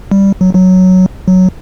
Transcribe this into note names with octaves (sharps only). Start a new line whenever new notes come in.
G3
F#3
F#3
F#3